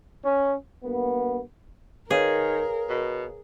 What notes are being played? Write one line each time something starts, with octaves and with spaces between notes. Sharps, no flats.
C#4
G2 A#3 B3
D#3 G#4 A#4 B4 C#5 F5
B2